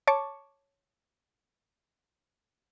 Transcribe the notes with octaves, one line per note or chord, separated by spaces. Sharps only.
C#5 A5 C#6 D6